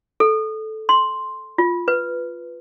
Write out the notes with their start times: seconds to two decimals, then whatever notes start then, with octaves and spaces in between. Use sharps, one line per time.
0.20 A4
0.89 C6
1.58 F4
1.88 B4